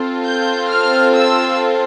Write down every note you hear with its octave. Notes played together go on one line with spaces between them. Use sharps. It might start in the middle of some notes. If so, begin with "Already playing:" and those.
Already playing: C4 F4 A4
G6
F6
E6